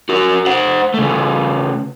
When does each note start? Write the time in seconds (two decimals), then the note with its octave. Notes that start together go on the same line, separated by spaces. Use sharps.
0.09 F#4 A#4
0.46 C5 F#5
0.94 C#3 A3